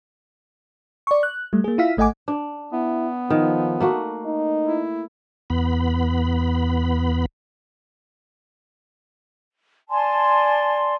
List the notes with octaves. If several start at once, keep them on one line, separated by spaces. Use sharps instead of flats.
D5 C#6
F#6
G3 A3
A#3 G#4
E4 F4 E5 F5 B6
G#1 A3 D#5 F#5 G#5 D6
D4
B3 E4
D#3 F3
A3 A#3 F#4
D#4
E4
E2 B3 B5
D5 G#5 A5 C6